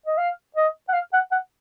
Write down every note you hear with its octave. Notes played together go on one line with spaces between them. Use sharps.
D#5
F5
D#5
F#5
F5
F#5
F#5